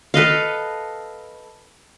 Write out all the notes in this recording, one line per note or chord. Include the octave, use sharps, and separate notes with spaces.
A4 B4 D#5 F5